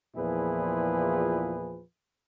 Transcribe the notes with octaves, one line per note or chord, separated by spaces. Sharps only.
E2 A#2 F3 E4 G#4 B4